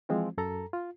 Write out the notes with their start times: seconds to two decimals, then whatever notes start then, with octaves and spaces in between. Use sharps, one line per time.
0.09 E3 F3 G#3 C4 F4
0.38 F#2 A4 A#5
0.73 F4